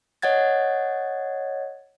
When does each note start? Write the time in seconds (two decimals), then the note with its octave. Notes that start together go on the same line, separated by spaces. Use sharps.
0.22 C#5 D#5 F#5 G#6 A6